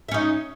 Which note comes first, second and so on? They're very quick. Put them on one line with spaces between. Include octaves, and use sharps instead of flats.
E5 C#4 D#4